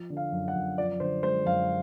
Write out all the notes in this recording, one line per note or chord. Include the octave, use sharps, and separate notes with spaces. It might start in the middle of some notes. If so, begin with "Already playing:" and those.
Already playing: F3
D3
F5
F#2
F#5
F#2
F3 D5
D3 C5
G#3 C5
F#2 F5